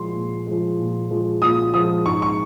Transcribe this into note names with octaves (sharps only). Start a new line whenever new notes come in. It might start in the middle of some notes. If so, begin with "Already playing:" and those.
Already playing: A#2 F3 G#3 C6
A#2
F3 G#3
A#2
F3 G#3
A#2 D#6
F3 G#3 D#6
G#2 C#6
C#6